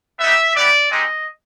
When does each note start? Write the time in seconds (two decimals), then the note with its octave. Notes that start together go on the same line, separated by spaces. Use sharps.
0.19 B3 D#4 G4 E5
0.55 B3 E4 G4 D5
0.90 G#3 C4 D#4 G4 D#5